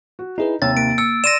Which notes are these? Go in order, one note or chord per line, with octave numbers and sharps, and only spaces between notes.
F#4
D#4 E4 G#4 B4
D#2 C3 C#5 E6 A6
A#3 D7
E6 C#7
D5 C6 A#6 D#7 E7